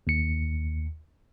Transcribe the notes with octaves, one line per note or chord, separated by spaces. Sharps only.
D#2 C#7